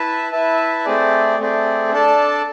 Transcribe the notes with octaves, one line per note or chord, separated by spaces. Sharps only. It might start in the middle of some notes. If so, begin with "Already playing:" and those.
Already playing: E4 B4 E5 A5
E4 B4 E5 A5
A3 C4 G#4 D5
A3 C4 G#4 D5
D4 A4 D5 A5